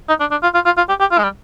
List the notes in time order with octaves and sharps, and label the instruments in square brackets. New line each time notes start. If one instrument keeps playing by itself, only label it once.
[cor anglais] D#4
D4
D4
F4
F4
F4
F4
G4
G4
F4
G#3
G3